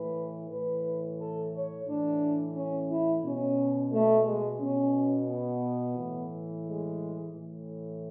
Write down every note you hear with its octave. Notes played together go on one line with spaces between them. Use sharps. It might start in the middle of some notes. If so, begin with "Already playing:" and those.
Already playing: A2 E3 B4
A2 E3 B4
A4
C#5
A2 E3 D4
C#4
E4
B2 C#4
A3
G#3
B2 C#4
B3
A2 E3
G#3
A2 E3